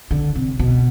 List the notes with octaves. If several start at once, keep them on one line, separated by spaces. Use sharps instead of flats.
D3
C3
B2